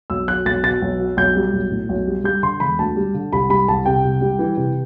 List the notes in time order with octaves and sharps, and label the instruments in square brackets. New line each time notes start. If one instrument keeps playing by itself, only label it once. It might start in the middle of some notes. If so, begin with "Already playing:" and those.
[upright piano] B1 E6
F#3 F#6
B1 A6
B2 A6
B1
F#3
B1 G6
G3
B1
A2
B1
G3
G3 G6
D3 C6
E1 B5
D2 A5
G3
D3
C2 B5
G3 B5
C2 A5
C3 G5
C2
G3
E3
C3